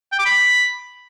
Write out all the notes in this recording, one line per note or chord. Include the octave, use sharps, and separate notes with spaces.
G5
D6
B5